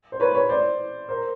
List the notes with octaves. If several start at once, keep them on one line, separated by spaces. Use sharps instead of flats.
C5
B4 C#5
B4 C#5
C5 D5
A#4 C5